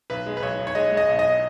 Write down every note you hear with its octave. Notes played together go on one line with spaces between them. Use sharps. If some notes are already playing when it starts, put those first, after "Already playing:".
B1 B4
G#3
B4
B1 C#5
B1
C#5
G#3 D#5
G#3
D#5
B1
D#5